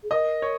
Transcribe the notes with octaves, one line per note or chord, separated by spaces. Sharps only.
G#4
A#4 D#5
C#5